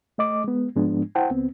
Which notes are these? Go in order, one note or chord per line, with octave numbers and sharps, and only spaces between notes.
A3 D#5 D6
G#3 B3
G#2 F3 G#3 B3 D4
E4 C5 F#5 G5 A5
C#2 B3 C4